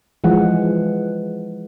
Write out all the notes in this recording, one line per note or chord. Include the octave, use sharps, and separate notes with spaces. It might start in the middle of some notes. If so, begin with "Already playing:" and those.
E3 F3 G#3 F#5